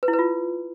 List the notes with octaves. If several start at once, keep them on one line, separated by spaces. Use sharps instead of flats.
B4
E4
B4
F4